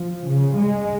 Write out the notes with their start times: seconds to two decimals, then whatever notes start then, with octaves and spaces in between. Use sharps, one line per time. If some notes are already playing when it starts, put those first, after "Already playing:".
Already playing: F3
0.29 C#3
0.58 G#3